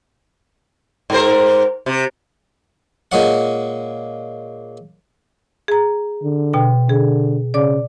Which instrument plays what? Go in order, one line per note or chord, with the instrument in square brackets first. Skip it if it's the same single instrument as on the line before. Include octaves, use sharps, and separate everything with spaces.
[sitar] G#2 A#4 C5
C3
[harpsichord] A#2 G#3 C#4 F#5
[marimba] G#4 A#5
[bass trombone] D3
[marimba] B2 G5
[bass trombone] D3 [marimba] G#4
[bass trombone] C#3 [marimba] D5 D6